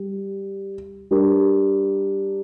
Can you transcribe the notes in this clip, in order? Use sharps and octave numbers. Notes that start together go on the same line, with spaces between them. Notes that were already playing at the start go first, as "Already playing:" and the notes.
Already playing: G3
G3 D4 G4 A#4